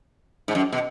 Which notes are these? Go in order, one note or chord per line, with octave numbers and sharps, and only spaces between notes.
G#2
F#2
B2